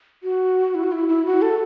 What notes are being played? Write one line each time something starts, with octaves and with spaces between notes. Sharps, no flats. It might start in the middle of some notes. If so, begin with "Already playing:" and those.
F#4
E4
F#4
E4
E4
F#4
A4